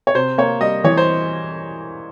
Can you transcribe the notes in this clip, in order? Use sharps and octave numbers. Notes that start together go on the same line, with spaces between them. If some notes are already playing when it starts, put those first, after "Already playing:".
C#5
C3 C5
A#3 C#5
G3 D#5
E3 C#5
C5